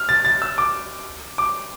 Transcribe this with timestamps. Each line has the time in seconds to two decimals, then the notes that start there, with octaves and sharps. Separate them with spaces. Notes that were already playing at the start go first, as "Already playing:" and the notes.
Already playing: F6
0.09 A6
0.25 A6
0.42 E6
0.58 D6
1.38 D6